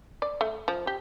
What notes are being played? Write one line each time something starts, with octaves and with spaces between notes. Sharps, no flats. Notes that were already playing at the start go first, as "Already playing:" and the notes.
D5
A3
F3
G4